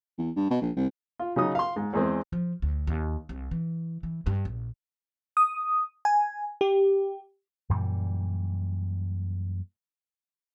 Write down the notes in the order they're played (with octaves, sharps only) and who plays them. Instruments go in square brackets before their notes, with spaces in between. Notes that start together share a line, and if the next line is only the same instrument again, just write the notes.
[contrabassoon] E2
G2
B2
A#1
C2
[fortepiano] F4
C#3 F#3 D#4 D#6
F5 C6
G#2
E2 G#3 C4
[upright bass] F3
D2
D#2
C2
E3
E3
G2
A#1
[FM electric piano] D#6
G#5
G4
[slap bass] F#2 A#2 E3 G3